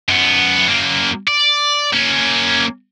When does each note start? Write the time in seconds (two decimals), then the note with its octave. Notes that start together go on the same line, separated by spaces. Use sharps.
0.09 F#2 B3
0.68 F#2 A#3
1.28 D5
1.93 A#3 C#4